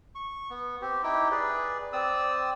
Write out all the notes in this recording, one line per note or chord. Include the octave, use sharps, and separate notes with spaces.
C#6
B3
C4 G4
D#4 E4 G4 G5
G#4 B4 D5
C4 D5 D#6 E6